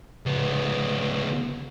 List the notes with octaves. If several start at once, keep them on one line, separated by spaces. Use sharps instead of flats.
C#2 B3